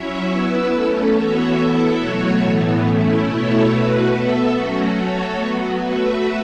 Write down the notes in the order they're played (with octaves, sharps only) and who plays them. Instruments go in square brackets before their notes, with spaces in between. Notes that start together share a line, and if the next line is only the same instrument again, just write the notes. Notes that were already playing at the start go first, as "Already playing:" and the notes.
Already playing: [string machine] F#3 C#4 E4 C#5 E5
B3 E4 B4 E5
A3 C#4 A4
E3 B3 F#4 C#5 E5
B3 E4 A4 E5
B2 F#3 A3 F#4 C#5
A2 E3 B3
A3 C#4 E4
B2 A3 E4 A4 C#5
B2 A3 F#4 B4
B3 A4 E5
F#3 A3 C#4 F#4
A3 F#4 A4 C#5
F#3 B3 F#4
A3 F#4 B4 E5